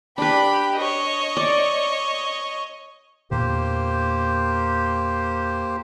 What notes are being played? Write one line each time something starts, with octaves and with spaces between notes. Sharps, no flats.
D4 G4 B4 B5
C#5 D#5
D5
E2 A#2 D3 A#3 G4 C5